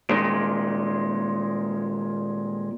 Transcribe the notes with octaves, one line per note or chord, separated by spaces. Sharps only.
A#2 D#3 G#3